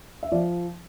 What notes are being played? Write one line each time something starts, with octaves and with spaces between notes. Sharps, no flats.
E5
F3 D5